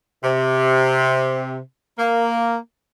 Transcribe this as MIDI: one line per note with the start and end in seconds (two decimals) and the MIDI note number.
0.24 1.59 48
1.99 2.57 58